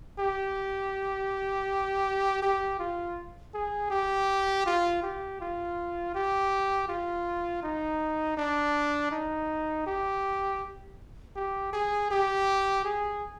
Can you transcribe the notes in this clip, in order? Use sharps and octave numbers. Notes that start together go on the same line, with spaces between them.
G4
G4
F4
G#4
G4
F4
G4
F4
G4
F4
D#4
D4
D#4
G4
G4
G#4
G4
G#4